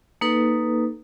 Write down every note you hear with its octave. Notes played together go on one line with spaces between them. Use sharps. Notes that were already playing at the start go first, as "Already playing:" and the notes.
A#3 D#4 A4 B4